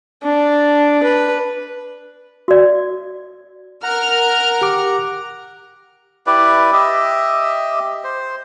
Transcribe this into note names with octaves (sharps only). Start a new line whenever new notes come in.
D4
B4
F#4 D5
A#4 F#5 A#5 F6
G4 D6
E4 G4 B4 D5
G4 D#5 E5
C5